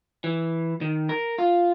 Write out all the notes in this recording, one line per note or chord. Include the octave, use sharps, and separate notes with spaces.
E3
D#3
A#4
F4